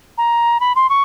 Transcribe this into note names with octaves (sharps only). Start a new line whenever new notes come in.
A#5
B5
C6
C#6